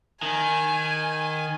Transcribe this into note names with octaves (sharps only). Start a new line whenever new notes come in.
D#3 G#5